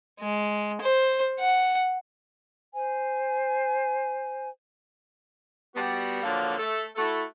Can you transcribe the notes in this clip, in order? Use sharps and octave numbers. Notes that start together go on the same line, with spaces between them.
G#3
C5
F#5
C5 G#5
G3 B3 F#4
D3 F3 F#3 A#3 D4 A4
A3 A4
A3 E4 F#4 A4